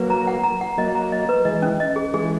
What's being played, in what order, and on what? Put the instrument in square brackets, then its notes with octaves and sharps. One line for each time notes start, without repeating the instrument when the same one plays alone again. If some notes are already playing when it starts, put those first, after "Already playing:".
Already playing: [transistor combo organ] F#3 A#3 [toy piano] B4
[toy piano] A#5
F#5
A#5
F#5
[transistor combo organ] F#3 A#3 [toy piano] D#5
[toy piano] A#5
D#5
B4
[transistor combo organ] E3 G#3 [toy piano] D#5
[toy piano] C#4
D#5
G#4
[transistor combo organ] E3 G#3 [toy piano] G#4